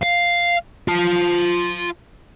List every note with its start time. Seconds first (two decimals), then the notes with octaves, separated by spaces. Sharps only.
0.03 F5
0.88 F4 A5